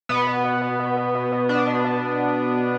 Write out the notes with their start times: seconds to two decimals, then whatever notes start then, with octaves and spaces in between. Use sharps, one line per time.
0.09 B2 B3
0.27 B2
0.44 B2
0.62 B2
0.80 B2
0.97 B2
1.15 B2
1.32 B2
1.49 B2 D4
1.67 B2
1.84 B2